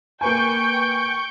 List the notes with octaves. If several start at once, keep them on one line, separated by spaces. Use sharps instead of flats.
A#3 B4 G5 G#5 C#6 G6 D7